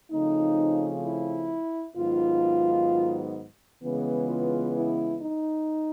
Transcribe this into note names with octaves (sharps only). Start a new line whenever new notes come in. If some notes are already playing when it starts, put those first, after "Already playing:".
C#3 F3 A3 C4 D#4
E4
G#2 D#3 F#3 B3 F4
C#3 E3 G#3 B3
F4
E4
D#4